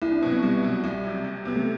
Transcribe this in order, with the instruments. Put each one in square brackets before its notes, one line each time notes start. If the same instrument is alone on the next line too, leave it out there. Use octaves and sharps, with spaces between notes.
[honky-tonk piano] C2 [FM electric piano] E4
[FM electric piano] D4
[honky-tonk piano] B2 F#3 [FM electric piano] C4
[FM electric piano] B3
[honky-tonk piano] C2 [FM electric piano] G3
[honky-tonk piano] B2 F#3
[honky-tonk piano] C2 [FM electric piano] G3
[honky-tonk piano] C3 F#3
C2
[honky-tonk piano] C3 F#3 [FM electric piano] B3
[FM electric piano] A3